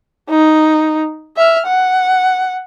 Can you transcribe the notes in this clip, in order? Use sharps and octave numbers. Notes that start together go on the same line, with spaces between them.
D#4
E5 F6
F#5